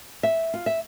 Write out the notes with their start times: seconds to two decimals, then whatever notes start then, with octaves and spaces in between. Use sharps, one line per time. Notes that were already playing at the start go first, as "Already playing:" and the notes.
0.23 E5
0.54 F4
0.66 E5